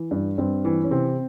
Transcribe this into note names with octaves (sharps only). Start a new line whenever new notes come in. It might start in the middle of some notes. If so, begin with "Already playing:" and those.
Already playing: E3
G2
G2 C4
E3
C#4
C3 C4